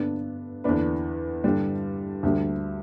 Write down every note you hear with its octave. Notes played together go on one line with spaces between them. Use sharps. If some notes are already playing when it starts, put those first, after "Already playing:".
Already playing: G2 D3 B3 D4
E2 D3 B3 D4 B4
G2 D3 G3 D4
D2 D3 G3